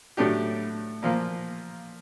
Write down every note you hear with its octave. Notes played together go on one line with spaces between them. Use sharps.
A2 F#3 A3 D4 G4
A#2 F3 A#3